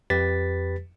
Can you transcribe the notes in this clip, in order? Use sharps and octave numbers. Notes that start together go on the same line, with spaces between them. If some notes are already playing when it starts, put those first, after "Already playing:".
F2 G4 B4 A6 B6